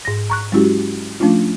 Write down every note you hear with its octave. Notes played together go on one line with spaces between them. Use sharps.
G#2 A#6
A#5 C#6 F#6
F#3 G#3 C#4 E4 F#4 G4
F3 A3 C#4 D4 F4